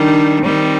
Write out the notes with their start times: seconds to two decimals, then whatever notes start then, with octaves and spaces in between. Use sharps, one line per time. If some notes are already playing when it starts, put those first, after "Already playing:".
Already playing: D#3 G3 D4
0.43 D#3 G3 C4